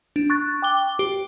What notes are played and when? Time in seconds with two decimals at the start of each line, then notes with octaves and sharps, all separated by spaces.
0.16 D4
0.30 C#6 F#6 A6
0.62 G5 D6 G7
0.99 G4